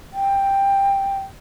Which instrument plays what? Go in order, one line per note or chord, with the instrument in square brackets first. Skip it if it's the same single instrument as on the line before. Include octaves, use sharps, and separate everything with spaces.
[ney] G5